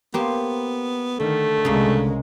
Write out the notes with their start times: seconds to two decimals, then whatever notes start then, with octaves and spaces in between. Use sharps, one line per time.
0.14 A#3 B3 G4 C5
1.19 D3 D#3 A3
1.65 C2 C#3 G#3 A#3